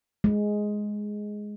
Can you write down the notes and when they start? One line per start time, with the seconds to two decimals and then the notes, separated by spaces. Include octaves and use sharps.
0.24 G#3